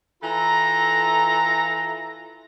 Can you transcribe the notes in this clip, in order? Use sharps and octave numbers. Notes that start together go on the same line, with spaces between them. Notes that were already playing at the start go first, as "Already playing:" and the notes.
E3 F4 A4 A#5